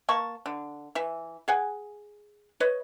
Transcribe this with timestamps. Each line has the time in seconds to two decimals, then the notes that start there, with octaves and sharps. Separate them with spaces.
0.09 A#3 A5 C#6
0.46 D3
0.95 E3 E5
1.48 G#4 F#5 G#5
2.60 B4 C#5 D#5